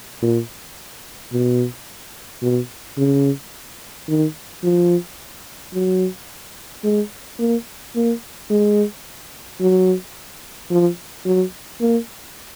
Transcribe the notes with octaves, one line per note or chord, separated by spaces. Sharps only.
A#2
B2
B2
C#3
D#3
F3
F#3
G#3
A#3
A#3
G#3
F#3
F3
F#3
A#3